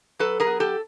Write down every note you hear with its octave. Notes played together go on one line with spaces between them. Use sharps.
F#3 A4 B4
G#4 A#4
B3
G4 A4